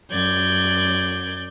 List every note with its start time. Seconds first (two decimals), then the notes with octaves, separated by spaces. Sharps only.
0.11 F#2 D5 G6 G#6